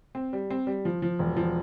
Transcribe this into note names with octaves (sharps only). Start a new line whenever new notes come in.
C4
G3
C4
G3
F3
F3
E1
F3